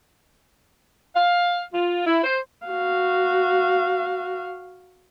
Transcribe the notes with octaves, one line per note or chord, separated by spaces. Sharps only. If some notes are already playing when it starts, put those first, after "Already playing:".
F5
F4
E4
C5
F#4 F5